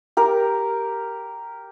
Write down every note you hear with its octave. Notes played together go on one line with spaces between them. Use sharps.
G4 A#4